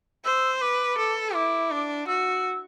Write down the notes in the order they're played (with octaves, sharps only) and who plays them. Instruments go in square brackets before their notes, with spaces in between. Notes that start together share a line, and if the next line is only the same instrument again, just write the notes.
[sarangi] C5 [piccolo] E6
[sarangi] B4 [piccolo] D6
[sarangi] A4
[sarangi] E4 [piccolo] D6
[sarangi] D4
[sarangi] F#4 [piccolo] E6